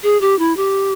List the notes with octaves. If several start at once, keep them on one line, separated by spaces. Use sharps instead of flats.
G#4
G4
E4
G4